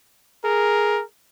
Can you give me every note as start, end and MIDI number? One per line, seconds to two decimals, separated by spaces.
0.45 1.01 68
0.45 1.03 70